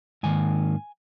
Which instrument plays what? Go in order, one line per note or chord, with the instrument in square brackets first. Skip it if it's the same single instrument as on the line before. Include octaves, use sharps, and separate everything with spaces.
[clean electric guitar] G#2 D#3 A#3 G#5